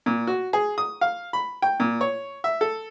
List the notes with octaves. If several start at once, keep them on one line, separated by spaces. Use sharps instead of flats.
A#2
F#4
G#4
D#6
F5
B5
G5
A#2
C#5
E5
A4